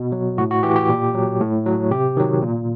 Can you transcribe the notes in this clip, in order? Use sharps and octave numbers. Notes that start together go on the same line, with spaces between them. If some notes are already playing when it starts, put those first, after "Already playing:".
Already playing: B2
F#3
A2 F#4
F#4
E3 G4
G4
A#2
F#3
A2
F#3
C3 G4
D#3 F#3
A#2